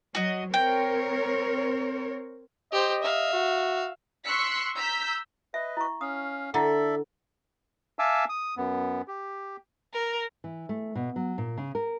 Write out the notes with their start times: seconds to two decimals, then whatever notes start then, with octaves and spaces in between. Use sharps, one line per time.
0.15 F#3 F#4 D#5
0.54 C4 A#4 C#5 G5
2.72 G4 C5 D#5
3.02 E5 F5
3.33 F#4
4.26 C6 C#6 E6 F#6 B6 C#7
4.76 A#5 E6 G6 B6
5.54 B4 D#5 E5
5.77 E4 C#6
6.01 C#4 F5 D#6
6.54 D3 E4 A4 D5 E5 F#5
7.99 E5 F5 G#5 A5 D6 E6
8.29 D#6
8.57 F#2 B3
9.08 G4
9.94 A#4
10.44 E3
10.69 A3
10.95 B2
11.16 F#3
11.38 A#2
11.58 C#3
11.75 A#4